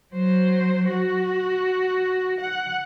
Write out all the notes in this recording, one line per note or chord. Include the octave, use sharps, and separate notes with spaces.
F#3 C5
F#4
F#5